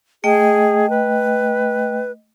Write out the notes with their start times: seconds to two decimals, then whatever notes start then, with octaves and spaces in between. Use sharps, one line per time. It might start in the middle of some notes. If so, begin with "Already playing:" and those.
0.24 A3 G#4 D#5 G5
0.90 B4